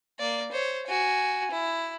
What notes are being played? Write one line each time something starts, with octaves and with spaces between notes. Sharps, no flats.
A#3 D5
C5 C#5
F#4 G#5
E4